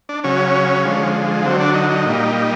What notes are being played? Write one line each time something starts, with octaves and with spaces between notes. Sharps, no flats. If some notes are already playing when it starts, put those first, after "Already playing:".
D4
C#3 F#3 C#4
D3 F3 G#3
D3 F#3 C4
D4
D#4
D#4
A#2 G3